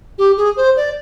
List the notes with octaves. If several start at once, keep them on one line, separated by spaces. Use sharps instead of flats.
G4
G#4
C5
D5